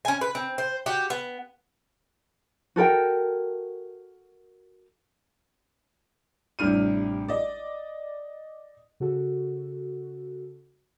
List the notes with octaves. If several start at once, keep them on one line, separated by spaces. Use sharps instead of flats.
C#4 G#5
B4
C4
C5
F#4 G4
B3
F#4 A4 A#4 G5
A1 C3 G3 D4 F6 D#7
D5 D#5
C#3 F#4 A4